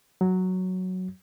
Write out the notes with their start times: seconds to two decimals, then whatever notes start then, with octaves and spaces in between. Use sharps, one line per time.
0.21 F#3